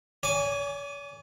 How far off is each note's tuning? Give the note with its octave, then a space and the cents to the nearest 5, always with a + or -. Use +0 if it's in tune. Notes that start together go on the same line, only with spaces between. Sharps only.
C#5 +45 G#5 +0 D6 +0